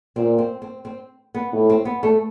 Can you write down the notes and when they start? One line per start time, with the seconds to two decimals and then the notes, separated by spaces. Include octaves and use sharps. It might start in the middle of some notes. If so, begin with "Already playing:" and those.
0.16 A#2 C4
0.38 C4
0.62 C4
0.85 C4
1.35 B3
1.52 A2
1.70 C4
1.85 B3
2.03 A3